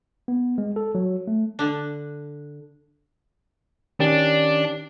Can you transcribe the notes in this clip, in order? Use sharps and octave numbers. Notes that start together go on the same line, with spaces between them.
B3
G#3
A4
F#3
A3
D3 D4
D#3 C#4 D4 G4